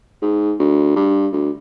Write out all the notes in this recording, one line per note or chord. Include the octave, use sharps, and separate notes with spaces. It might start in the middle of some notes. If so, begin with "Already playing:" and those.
G#2
D2
G2
D2